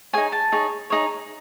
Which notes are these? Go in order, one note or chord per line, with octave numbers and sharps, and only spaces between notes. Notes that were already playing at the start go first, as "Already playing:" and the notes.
D#4 G#4 C#5 G#5
A5
D#4 G#4 C#5
D#4 G#4 C#5